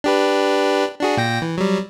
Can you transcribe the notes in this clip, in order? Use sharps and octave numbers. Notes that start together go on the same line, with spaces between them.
D4 G4 B4
D4 F#4 G#4
A#2 G5 A#6
E3
F#3 G3